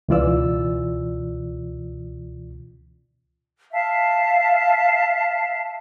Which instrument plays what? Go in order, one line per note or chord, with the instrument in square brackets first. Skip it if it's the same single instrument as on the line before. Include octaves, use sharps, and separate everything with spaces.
[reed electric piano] C#2 B2 E3 F4 D5 E6
[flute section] E5 F5 A5